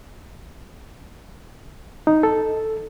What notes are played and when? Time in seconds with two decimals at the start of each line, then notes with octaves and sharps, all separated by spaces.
2.07 D#4
2.23 A4